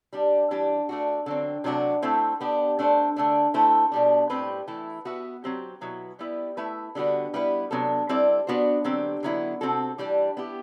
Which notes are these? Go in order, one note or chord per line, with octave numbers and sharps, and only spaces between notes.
G3 D4 G4
E3 G3 D4 G4
A3 D4 F#4
D3 F#3 C4
C3 F#3 A3 D4 F#4
A3 C4 E4 A4 C5
B3 D4 G4
A3 D4 A4 C5
D3 A3 D4
A3 E4 A4 C5
B2 G3 D4
A2 G3 C4 G4 B4
E3 A3 E4
B3 F#4 B4 E5
F#3 C4 G4
B2 F#3 B3 E4
G3 B3 E4 B4
A3 E4 B4 E5
D3 G3 B3 F#4 B4
G3 B3 E4 B4
C3 F#3 B3 D4 A4
G3 C4 E4 A4 D5
B3 D4 F#4 C5
D3 F#3 C4 G4
D3 F#3 B3 E4
C3 F#3 C4 F#4 A4
E3 G3 D4 G4 D5
B3 E4 G4